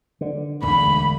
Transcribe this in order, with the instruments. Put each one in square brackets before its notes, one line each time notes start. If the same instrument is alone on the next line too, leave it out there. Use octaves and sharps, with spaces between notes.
[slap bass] D3
[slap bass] E1 D3 [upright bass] D2 [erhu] B5